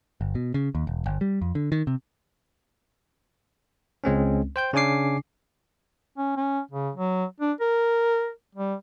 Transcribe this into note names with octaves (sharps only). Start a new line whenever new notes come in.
G1
B2
C#3
D#2
E1
G1
G3
F2
D3
D#3
C3
C#2 G#3 C4 C#4
C5 G5 G6
C#3 C#4 D4 G#5 D6 C7
C#4
C#4
C#3
F#3
D4
A#4
G3